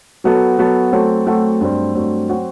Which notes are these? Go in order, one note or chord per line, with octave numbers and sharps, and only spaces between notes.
F#3 B3 F#4 A4
F#3 B3 F#4 A4
F#3 A3 C4 F#4 A4
F#3 A3 C4 F#4 A4
G2 F#3 A3 C4
G2 F#3 A3 C4
F#3 C4 F#4